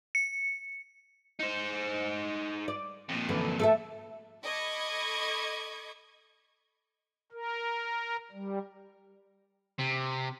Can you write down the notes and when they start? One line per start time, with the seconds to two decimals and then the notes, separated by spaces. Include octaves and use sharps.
0.15 C#7
1.40 D#4 C5
2.68 D5
3.09 F2 A#2
3.29 F#2 D3 E3
3.60 A3 A4 E5
4.43 A4 D#5 B5 C#6 D6 G#6
7.32 A#4
8.31 G3
9.79 C3